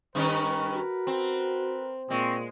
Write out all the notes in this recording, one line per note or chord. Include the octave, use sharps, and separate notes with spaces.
G2 D#3 C#4 A#4 B4
F#4
C4
A#2 G#3 C4 C#6